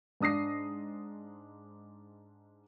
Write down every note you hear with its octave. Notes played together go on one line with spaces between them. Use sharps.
G#2 D4 D#6 A#6 C7